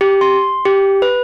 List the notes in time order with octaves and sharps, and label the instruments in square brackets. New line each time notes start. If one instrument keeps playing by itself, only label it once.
[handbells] G4
C6
G4
B4